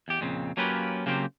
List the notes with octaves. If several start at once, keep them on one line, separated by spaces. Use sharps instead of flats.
E2 G4
F2 A#2 C#3 C4
F#3 A#3 C#4 F4 G4 B4
C#3 F#3 A#3 C4 G4 C5